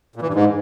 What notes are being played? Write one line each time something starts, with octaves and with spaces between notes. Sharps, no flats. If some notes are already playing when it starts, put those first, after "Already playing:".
A#2
E3
G2
G#2